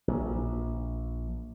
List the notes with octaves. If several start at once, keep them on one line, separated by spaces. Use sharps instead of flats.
A#1